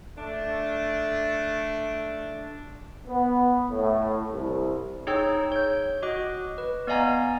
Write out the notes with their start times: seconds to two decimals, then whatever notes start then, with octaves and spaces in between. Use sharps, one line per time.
0.18 A3 D4
3.08 B3
3.71 A2
4.32 C2
5.07 D#4 G#4 C#5 G5 E6
5.52 C#5 G6
6.03 F#4 D#5 D6 F#6
6.58 B4
6.87 B3 D5 D#5 F5 G#5 A#5